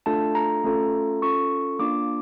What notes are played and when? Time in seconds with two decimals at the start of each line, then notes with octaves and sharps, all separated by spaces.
0.06 A3 D4 F4 A4 A5
0.35 A#5
0.64 A3 C#4 F4 A4
1.22 C#4 F4 A4 C#6
1.79 A#3 D4 F4 D6